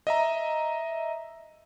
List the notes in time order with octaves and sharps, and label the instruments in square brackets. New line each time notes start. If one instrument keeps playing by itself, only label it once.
[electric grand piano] D#5 E5 A#5